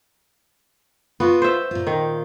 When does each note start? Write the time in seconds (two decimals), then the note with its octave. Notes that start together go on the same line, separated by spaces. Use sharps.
1.20 B3 F4 F#4
1.42 C5 E5
1.71 A#2 F4
1.87 D#3